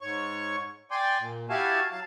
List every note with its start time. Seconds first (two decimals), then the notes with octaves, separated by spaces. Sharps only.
0.01 G#2 C#5 C#6
0.91 D5 G5 G#5 C6 D6
1.19 A#2
1.50 E4 F#4 G4 F5 G#5 A5
1.91 F#3 F5 A5